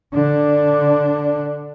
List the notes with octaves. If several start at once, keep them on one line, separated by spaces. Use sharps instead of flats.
D3 D4